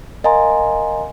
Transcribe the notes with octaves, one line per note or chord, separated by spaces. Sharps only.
A#4 D#5 F5 G#5 A#5 C6